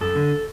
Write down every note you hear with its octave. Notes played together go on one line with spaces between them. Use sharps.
F#2 A4
D3